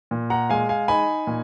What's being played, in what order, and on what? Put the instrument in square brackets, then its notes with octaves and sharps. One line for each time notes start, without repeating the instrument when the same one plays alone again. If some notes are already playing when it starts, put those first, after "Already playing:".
[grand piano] A#2
F#5 A#5
G#3 F5 G#5
F5 G#5
D#4 G#5 B5
A#2